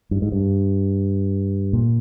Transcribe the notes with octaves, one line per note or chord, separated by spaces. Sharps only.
G2
G#2
G2
A#2